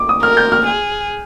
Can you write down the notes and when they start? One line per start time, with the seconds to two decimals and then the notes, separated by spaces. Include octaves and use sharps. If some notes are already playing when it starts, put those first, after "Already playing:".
Already playing: D6
0.09 D#6
0.23 A#4 F6
0.37 G6
0.52 F6
0.66 G#4